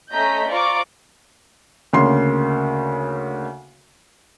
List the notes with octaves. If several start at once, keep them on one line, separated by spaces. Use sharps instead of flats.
A3 C#4 D#5 A#5 G6 B6
F4 C5 D5 A#5 C#6 D6
D2 C#3 A#3 C#5 C6 C7